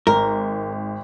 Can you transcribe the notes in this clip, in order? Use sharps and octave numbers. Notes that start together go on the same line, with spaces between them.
G#1 A#4